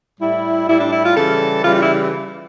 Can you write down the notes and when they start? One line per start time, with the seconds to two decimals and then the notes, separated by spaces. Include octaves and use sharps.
0.20 A2 G3 E4
0.68 A2 G3 E4
0.80 D4
0.93 E4
1.04 F4
1.17 C#3 E3 G3 A4
1.64 C#3 E3 G3 F4
1.75 F4
1.80 E4